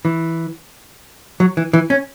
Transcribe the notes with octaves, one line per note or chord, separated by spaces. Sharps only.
E3
F#3
E3
E3
C#4